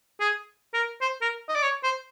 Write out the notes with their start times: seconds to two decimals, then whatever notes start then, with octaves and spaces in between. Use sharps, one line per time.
0.20 G#4
0.74 A#4
1.01 C5
1.21 A#4
1.48 D#5
1.55 D5
1.63 C#5
1.84 C5